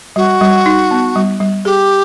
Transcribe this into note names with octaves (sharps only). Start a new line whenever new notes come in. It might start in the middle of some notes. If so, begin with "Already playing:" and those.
G3 F#4
G3
D#4
B3
G3
G3
G4 G#4